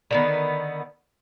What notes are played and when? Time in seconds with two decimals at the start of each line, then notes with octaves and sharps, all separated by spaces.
0.11 D3 D#3 B3